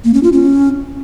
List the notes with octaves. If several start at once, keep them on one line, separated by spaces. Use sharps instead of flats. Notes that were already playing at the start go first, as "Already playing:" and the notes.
A#3
C#4
F4
C#4